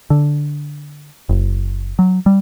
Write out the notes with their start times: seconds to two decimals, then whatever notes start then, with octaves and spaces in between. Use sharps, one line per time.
0.10 D3
1.29 F#1
1.99 F#3
2.26 G3